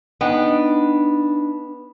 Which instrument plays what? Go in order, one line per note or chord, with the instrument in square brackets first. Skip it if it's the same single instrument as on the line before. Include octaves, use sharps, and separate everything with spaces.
[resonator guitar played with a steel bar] B3 [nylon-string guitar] D4 D#4 G5